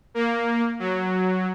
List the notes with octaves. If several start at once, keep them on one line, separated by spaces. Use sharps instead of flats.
A#3
F#3